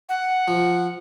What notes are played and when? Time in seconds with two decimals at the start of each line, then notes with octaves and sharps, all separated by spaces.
0.09 F#5
0.48 F3